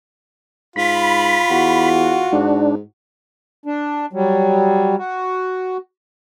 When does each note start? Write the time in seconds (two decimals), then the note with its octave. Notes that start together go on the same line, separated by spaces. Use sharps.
0.76 G#2 F4 B5
1.50 E2 F#4
2.33 G#2 D4
3.66 D4
4.13 F#3 G3
4.98 F#4